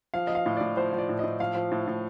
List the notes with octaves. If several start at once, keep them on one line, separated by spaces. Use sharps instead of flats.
F3 F5
F3 D#5
F5
A2
A2 D5
F3 C5
F3
D5
A2
A2 D#5
F3 F5
F3
A2
A2